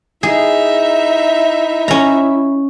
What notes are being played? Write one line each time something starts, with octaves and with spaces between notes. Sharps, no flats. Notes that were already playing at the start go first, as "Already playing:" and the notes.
D#4 E4 G#4 E5
C#4 A#5